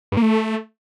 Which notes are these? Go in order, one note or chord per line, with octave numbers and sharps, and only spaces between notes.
G2
A#3
A3